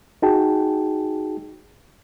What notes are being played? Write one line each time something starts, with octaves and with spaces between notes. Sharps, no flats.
D#4 F#4 G#4 G5 A5